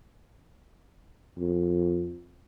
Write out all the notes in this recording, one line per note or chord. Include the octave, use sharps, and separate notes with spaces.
F2